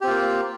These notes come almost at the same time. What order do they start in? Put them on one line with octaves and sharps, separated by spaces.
G4 C4 F4 A#3